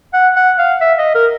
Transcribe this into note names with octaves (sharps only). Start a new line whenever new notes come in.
F#5
F#5
F5
E5
D#5
A#4